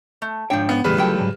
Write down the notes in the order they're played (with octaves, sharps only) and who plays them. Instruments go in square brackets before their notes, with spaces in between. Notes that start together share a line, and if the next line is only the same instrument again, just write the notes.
[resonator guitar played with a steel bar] A3
[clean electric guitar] G#2 D4 C#5 [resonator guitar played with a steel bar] F3 G5
[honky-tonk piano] B3
[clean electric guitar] E2 A2 [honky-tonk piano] C#3 G3 B4
[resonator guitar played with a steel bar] D3 A4 G5 [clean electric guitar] F#3 A3 F4
[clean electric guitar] G#2 F#3